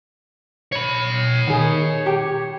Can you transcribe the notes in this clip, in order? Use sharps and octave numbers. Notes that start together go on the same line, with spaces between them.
C#5 B5
D#3 G#4
G4